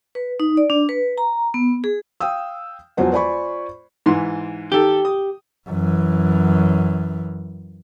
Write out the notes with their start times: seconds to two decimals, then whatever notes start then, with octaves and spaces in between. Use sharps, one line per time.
0.15 B4
0.40 D#4
0.57 D5
0.70 D4
0.89 B4
1.18 A#5
1.54 B3
1.84 G#4
2.21 F5 G5 D#6 E6
2.97 E1 E2 F3 F#3 C5 F#5
3.12 F4 C5 D5 G#5 B5 C#6
4.06 G#2 E3 C6
4.72 D#3 G4 A4
5.05 D#6
5.69 F#2 E3